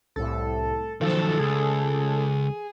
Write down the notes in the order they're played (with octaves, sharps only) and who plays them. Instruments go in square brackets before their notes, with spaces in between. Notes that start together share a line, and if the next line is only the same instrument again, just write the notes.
[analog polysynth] C2 A2 [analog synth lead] A4
[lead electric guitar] D#3 F#3 [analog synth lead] F3 [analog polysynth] A4
[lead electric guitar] C#2 [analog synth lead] G#4